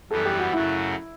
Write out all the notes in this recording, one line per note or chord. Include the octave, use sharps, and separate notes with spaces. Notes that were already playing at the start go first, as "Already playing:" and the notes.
F#2 E3 G3 B3 A4
G4
F#4
F#2 C#3 F#3 A3 E4